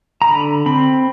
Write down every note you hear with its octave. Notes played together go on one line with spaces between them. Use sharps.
A#5
D3 B5
C4 B5